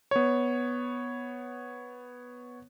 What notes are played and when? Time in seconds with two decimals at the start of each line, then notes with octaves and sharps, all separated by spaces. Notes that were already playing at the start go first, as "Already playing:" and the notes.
0.11 B3 C#5